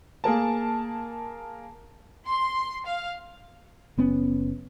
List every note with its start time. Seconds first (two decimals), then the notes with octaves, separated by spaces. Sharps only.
0.24 A#3 G#4 A#4 A5
2.28 C6
2.86 F5
3.98 F#1 B3 C#4